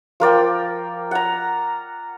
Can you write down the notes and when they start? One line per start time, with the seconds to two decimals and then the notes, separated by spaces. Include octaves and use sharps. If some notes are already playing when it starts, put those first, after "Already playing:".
0.20 F3 A#4 D5 G5
1.11 F#5 A#5